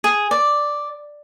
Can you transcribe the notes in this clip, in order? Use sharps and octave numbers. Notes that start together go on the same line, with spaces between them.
G#4
D5